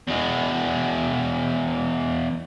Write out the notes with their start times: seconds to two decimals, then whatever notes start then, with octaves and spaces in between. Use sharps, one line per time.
0.08 E2 G#3